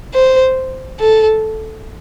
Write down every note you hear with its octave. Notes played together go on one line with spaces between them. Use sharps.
C5
A4